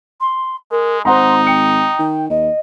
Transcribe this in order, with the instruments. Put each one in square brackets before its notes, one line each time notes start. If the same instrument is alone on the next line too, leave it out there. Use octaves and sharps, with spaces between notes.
[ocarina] C6
[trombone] G#3 [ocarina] A#4
[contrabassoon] G#1 [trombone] D#4 [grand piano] C5 F#5 A#5 [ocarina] C6
[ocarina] G5 [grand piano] C#7
[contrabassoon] D#3
[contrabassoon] D#2 [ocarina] D#5